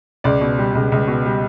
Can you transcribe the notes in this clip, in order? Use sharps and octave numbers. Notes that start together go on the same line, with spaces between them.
C#2 D5
B2
G3
C#2
C#2
B2
G3